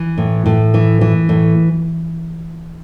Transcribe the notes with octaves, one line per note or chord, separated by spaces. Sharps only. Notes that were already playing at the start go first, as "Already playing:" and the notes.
Already playing: E3
A2
A2
E3
E3
A2